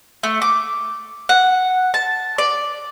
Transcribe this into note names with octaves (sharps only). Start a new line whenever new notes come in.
A3
D6
F#5
A5
D5